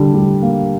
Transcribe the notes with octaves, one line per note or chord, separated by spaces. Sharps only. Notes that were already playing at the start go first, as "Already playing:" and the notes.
Already playing: D3 G3
G3
A#3